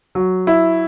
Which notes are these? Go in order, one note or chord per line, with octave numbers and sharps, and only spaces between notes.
F#3
E4